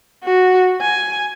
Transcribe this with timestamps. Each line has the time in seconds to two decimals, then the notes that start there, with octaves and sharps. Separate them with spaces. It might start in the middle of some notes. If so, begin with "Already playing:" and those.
0.24 F#4
0.82 G#5